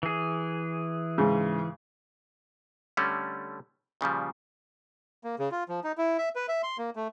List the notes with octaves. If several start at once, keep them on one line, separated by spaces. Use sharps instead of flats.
E3 G#4
G#2 C#3
D3 G3 A3 C#4
A#2 C#3 F3 G3
A#3
C#3
F4
F3
D#4
E4
E5
B4
E5
C6
A#3
A3